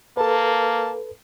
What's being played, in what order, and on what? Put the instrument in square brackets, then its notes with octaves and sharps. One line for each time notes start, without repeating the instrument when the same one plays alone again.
[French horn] A#3 [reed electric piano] A4 B4 [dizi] A5